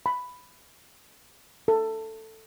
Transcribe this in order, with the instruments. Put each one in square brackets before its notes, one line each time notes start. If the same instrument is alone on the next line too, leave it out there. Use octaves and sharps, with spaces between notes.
[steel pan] B5
A4